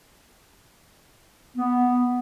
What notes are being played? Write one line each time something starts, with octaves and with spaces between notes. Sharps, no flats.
B3